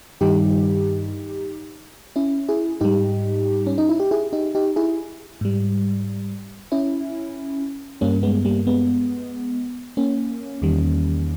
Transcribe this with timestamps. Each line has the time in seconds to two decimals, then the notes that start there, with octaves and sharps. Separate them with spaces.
0.21 G2 D#3 G3 D#4 G4
2.16 C#4 E4
2.49 E4 G#4
2.81 G#2 G3 D#4 G4
3.67 C#4
3.78 D#4
3.89 E4
4.00 G4
4.11 E4 G#4
4.33 D#4 G4
4.55 D#4 G4
4.76 E4 G#4
5.41 G#2 G3
6.72 C#4 E4
8.01 G2 G3 A#3 C#4
8.23 G#3 B3
8.45 G3 A#3
8.67 G#3 B3
9.97 A#3 C#4
10.62 E2 D#3 G3